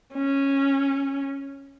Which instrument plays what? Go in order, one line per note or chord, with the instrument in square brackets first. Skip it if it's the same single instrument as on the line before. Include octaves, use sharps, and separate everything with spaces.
[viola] C#4